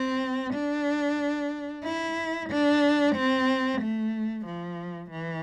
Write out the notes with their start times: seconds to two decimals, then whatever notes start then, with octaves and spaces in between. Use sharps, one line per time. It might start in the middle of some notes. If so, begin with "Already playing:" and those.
Already playing: C4
0.53 D4
1.84 E4
2.50 D4
3.16 C4
3.81 A3
4.46 F3
5.11 E3